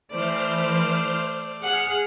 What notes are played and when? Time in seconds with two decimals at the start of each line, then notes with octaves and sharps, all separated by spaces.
0.11 E3 A3 C5 D5 F6
1.63 G#4 F#5 F6